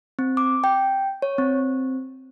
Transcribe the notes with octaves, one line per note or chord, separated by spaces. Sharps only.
C4
D6
G5
C#5
C4